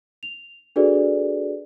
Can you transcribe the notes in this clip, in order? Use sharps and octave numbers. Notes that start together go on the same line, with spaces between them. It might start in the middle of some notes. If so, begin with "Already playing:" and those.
F7
D4 F#4 G#4 A4 B4 D5